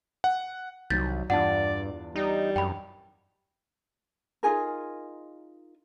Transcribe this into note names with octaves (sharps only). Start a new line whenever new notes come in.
F#5
C2 D#3 F#3 G6 A6 B6
E2 G2 D4 F4 D5 F#5 A5
G3 D#4
F#2 G5 B5
D#4 F4 G#4 A#4